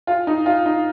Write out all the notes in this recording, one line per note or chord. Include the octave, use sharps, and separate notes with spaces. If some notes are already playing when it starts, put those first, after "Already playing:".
F4
D#4
F4
D#4